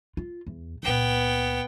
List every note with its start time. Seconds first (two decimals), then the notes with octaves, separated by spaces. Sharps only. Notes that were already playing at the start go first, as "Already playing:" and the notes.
0.17 F4
0.47 E2
0.83 C#2 A#2 B3 G5